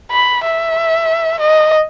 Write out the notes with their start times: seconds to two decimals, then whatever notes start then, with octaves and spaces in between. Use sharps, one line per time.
0.12 B5
0.44 E5
1.40 D#5